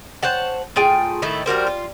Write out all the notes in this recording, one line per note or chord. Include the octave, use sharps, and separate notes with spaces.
C5 C#5 F#5 A5
A2 F4 G#4 G5
A2 D#3 A3 E4
G3 F#4 A#4 C5
F4